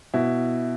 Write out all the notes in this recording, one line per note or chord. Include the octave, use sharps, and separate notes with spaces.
B2 E4